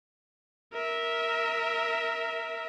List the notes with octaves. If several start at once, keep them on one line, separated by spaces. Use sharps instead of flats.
A#4 E5